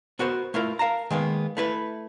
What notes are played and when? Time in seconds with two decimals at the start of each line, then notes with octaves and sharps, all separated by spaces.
0.19 B3 F#4 A#4 C5
0.54 A3 E4 F4 A#4
0.79 A#4 F5 A5 A#5
1.11 D#3 G#3 A#3 B3
1.57 A3 E4 B4